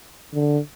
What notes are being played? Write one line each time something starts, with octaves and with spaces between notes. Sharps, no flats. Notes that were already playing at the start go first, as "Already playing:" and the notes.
D3